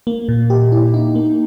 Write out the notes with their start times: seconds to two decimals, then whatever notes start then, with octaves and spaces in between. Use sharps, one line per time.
0.07 A#3
0.29 A#2
0.50 G4
0.72 E4
0.94 D#4
1.15 A#3